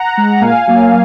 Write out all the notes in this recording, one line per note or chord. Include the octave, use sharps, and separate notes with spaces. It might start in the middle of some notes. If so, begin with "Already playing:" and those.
Already playing: F#5 A#5
G#3
F#5 A#5
A#2 F5 G#5
F#3 A#3